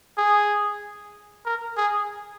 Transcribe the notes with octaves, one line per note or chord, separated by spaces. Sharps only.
G#4
A#4
G#4